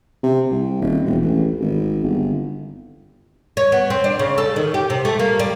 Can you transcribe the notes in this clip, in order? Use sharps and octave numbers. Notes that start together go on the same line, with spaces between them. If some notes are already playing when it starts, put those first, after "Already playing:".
C3
C2
D#1
E1
A1
G#1
G1
C#5
B3
C4
D4
C#3
A4
D#3
G4
C3
A3
A#3
G3